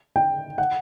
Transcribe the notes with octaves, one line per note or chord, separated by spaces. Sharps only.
G5
F#5